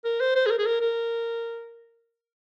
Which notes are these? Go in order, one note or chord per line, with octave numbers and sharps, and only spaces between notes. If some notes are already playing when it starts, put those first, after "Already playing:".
A#4
C5
C5
G#4
A#4
G#4
A#4
A#4